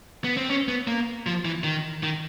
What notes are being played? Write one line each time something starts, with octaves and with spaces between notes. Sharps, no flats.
B3
C4
C#4
B3
A#3
F3
E3
D#3
D#3